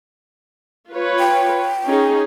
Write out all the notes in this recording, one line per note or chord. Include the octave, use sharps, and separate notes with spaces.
F4 B4 C#5
G5
C#4 D#4 G#4